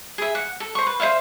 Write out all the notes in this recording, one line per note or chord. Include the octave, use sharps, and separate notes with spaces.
G#4 E5
F#5
A4
C5 C#6
B4
C5 C#5 E5 F5